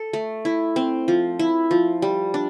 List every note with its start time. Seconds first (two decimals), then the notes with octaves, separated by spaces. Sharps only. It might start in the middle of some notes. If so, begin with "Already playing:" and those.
Already playing: A4
0.13 A3
0.45 E4
0.76 C4
1.08 F3
1.39 E4
1.71 F3
2.02 G3
2.34 D4